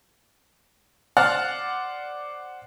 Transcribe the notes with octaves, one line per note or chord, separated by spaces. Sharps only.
C5 D5 F#5 F6 F#6 A6